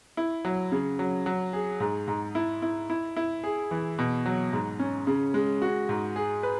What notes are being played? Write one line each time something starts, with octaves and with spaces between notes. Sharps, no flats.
E4
F#3
C#3
F#3
F#3
G#4
G#2
G#2
E4
E4
E4
E4
G#4
E3
B2
F#3
G#2
C#4
C#3
G#3
F#4
G#2
G#4
B4